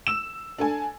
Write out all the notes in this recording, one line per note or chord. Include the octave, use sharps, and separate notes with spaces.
E6 E7
D4 A4 G#5